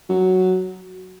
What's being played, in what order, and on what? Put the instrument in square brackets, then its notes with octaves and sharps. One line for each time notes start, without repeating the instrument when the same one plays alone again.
[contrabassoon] F#3